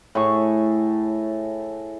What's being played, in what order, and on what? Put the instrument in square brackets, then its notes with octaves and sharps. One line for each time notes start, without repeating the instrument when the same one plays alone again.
[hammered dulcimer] A2 G#4 C#6